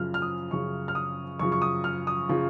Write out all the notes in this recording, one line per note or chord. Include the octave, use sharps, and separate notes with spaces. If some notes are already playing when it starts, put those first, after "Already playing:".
Already playing: F#2 C#3 F3 F6
F6
D#6
F#2 C#3 F3 C#6
F6
D#6
F#2 C#3 F3 C#6
C#6
D#6
F6
D#6
C#3 F3